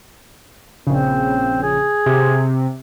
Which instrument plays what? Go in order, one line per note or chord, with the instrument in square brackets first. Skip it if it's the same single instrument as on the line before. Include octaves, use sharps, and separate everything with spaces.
[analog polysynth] A#1 C#3 [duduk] C4
[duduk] G#4
[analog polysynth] C3